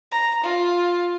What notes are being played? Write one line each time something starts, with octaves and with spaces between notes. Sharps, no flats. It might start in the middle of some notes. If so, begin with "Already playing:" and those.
A#5
F4